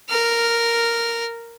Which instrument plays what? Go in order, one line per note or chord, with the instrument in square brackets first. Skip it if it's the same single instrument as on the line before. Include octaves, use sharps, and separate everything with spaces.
[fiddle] A#4 F6